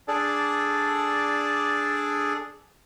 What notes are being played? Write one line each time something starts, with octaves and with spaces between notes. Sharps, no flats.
D4 G#4 A4 D5